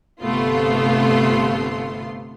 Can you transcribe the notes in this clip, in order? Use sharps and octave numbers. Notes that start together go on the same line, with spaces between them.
G1 C3 A3 B3 F4 C6